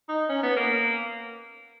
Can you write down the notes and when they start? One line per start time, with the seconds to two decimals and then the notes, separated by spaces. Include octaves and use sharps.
0.09 D#4
0.29 C#4
0.43 B3
0.56 A#3